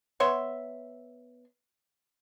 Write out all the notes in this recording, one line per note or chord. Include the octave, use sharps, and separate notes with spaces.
B3 C#5 E5 C6